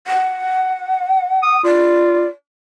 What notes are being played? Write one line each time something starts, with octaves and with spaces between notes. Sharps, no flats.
F#5
D#6
F4 D5